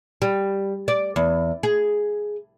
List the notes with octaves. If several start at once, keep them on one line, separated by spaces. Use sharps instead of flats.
G3
D5
E2
G#4